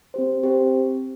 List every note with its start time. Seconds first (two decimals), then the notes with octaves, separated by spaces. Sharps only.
0.14 C4 G4 C5
0.43 C4 G4 C5